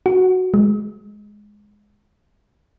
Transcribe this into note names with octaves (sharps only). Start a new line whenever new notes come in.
F#4
G#3